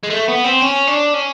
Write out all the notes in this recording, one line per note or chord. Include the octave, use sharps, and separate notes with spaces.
G#3
A3
B3
C4
C#4
D4
C#4